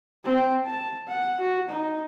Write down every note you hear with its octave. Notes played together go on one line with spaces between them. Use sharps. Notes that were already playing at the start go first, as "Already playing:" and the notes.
C4
A5
F#5
F#4
D#4